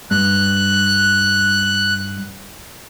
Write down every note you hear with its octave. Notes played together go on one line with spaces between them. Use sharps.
G2 F#6